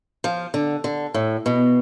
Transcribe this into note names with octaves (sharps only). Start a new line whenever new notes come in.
F3
D3
D3
A2
B2